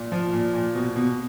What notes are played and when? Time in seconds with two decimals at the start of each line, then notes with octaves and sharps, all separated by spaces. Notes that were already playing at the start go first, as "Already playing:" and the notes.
Already playing: A#2
0.12 F3
0.33 A#2
0.53 A#2
0.75 B2
0.96 B2